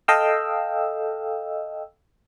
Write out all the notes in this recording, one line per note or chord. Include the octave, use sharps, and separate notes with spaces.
A4 D#5 F5 G5 E6